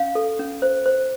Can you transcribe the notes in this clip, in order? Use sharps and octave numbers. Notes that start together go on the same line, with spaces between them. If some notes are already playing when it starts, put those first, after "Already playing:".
Already playing: C#4 F5
A4
C#4
C5
C5